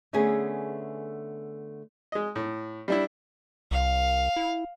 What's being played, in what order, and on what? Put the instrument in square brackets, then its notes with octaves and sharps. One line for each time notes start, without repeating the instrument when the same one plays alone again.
[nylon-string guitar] D3 A3 B3 C#4 G#4
[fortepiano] G#3 D#5
A2
G3 D4 E4
[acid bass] C2 [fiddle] F5
[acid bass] E4